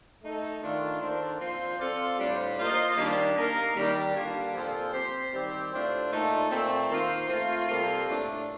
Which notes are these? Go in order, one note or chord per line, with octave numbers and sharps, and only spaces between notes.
A3 D#4 A4
D#3 A3 D4 F4
D#3 A#3 D4 A4 C5
F3 C4 F4 C5
C4 F4 A4 D5 F5
A2 G3 D4 F4 C5
A#3 F4 C5 D#5
D#3 G3 A#3 D4
A#3 D#4 A#4 F5
D#3 G3 D4 G4
D3 G3 A#3 D4 F4
A#2 F3 C4 F4 A4
C4 G4 C5
D#3 G3 C4 G4
A2 A3 D4 F4 C5
A#2 A3 D#4 A4
A#2 A3 C4
D#3 A#3 F4 C5
A3 C4 F4
C3 G3 A#3 F4 A4
A2 A3 D4